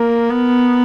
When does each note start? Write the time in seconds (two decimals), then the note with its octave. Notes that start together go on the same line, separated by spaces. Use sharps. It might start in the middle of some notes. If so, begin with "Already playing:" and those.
Already playing: A#3 A#4
0.30 B3